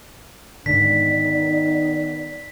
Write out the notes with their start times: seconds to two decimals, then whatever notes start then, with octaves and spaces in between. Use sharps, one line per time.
0.66 G#2 D3 D#3 B3 D#4 D5 B6